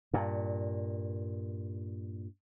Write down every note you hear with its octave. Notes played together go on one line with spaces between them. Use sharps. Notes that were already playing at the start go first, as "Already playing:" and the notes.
G2 A#2